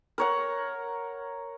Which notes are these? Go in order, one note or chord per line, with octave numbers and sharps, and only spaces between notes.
A#4 C#5 F#5